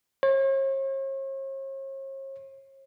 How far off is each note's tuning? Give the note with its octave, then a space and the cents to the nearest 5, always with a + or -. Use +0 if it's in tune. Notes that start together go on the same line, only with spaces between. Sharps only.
C#5 -45